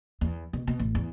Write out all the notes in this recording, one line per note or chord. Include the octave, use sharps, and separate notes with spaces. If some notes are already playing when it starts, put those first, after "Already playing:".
E2
B2
B2
A1
E2